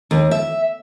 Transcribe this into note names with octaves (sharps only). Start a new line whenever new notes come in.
D#2
E5